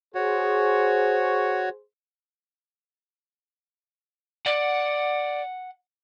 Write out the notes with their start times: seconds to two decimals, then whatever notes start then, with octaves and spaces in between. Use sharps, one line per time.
0.15 F#4 G#4 C5 C#5
4.46 D5 F#5